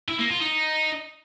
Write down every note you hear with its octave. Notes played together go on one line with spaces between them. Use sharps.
E4
A#3
F4
D#4